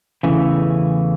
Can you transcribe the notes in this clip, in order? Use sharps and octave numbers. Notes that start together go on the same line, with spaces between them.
E2 C#3 E3 A3